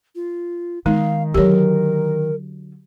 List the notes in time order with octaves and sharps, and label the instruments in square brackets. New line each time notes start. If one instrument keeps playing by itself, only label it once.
[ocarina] F4
[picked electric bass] D#3 [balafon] G#3 D#4 [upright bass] B3 [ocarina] F5
[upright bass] D3 F#3 [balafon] G4 C#5 [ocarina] A#4